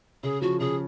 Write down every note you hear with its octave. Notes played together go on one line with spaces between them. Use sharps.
C#3 G#4
F3 F#4
C#3 G#4